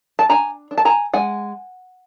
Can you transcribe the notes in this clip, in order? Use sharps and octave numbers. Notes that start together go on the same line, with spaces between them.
A5
D4 G#5 A#5
D4
A5
G#5 A#5
G#3 F#5 G#5